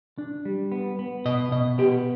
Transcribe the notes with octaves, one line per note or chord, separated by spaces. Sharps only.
D4
G3
B3
B3
B2 D#5
B2 D#5
B3 G4